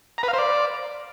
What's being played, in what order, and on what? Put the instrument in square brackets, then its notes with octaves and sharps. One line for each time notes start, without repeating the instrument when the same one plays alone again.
[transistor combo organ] A#5
B4
F5
C5
D5